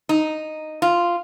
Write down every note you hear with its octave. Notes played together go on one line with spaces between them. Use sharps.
D#4
F4